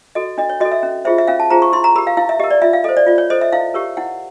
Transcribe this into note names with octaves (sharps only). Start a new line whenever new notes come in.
F#4 A4 D#5
D4 D#5
C#5
F#4 A4 D#5
E5
C#4
F4 G#4 C5 E5
E5
C#4 F5
A5
F4 G#4 C5 A#5
C#6
E4 C6
A#5
G4 A#4 B5
F5
E4 F5
E5
G4 A#4 D#5
D5
F4 E5
F5
A4 C5 D#5
D5
F4 D5
C#5
A4 C5 D#5
E5
E4 F5
G4 A#4 C#5
E4 F#5